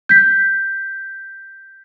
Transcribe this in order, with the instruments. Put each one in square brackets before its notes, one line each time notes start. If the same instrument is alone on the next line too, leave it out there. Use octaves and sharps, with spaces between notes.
[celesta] G6 B6